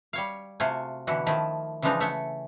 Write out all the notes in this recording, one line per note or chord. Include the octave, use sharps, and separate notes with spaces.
G3 C#5 F5
C3 A3 F4 F#4 G#5
B2 D3 E3 E4 F#4
D#3 F3 A3 E4
C#3 E3 F3 G#3 D4 D#4
A3 C#5 E5 F#5